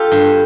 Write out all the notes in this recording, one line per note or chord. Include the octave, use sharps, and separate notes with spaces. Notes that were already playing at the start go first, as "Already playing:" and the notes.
Already playing: F4 G4 A4
G2